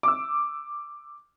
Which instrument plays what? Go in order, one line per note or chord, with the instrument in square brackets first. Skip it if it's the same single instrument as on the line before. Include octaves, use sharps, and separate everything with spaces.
[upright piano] D6 E6